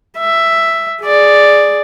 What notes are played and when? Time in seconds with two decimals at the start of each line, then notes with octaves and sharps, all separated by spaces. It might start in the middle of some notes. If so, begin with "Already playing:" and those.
0.19 E5
1.04 G#4 D5